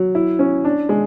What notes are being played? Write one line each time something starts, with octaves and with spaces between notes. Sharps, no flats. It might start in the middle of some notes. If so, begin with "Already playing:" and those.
Already playing: F#3
E4
C#4
D4
G#3